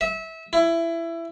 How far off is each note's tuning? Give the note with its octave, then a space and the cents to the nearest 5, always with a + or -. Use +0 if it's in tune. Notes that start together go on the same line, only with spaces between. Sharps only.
E5 -25
E4 +20